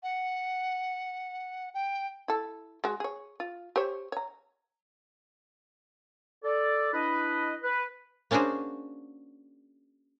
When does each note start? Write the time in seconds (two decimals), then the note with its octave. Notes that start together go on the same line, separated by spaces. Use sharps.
0.03 F#5
1.74 G5
2.28 E4 A4
2.84 G#3 F#4
3.00 G#4 C#5
3.40 F4
3.76 G4 C5 C#5
4.12 C#5 A#5
6.44 A4 D5
6.93 D4 E4 B4 D#5
7.63 B4
8.31 A#3 C#4 D4 F#4 G#4 C5